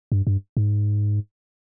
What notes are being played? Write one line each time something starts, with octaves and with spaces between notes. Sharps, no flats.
G2
G2
G#2